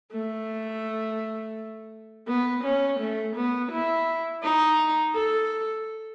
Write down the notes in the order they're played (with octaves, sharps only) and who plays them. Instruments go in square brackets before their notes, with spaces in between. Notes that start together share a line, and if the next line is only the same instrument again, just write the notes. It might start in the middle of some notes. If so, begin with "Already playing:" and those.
[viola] A3
B3
C#4
A3
B3
E4
D#4
A4